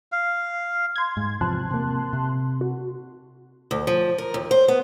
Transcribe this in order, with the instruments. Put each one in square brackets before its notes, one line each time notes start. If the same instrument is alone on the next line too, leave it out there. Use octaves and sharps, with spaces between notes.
[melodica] F5
[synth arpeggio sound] C6 G#6
[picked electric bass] G#2
[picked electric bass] E2 C3 F3 [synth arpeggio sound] A5 C6 F#6
[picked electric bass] C3 A#3
C3
[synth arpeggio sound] F#4
[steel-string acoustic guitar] D2
F3
A#4
D#2
C5
B3